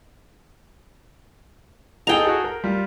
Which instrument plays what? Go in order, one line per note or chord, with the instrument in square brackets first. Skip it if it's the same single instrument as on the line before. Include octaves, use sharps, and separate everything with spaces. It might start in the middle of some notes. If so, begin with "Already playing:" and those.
[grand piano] D#4 G#4 A4 [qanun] G5 A#5
[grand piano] F#4 G#4 A4
A#4
G3 F4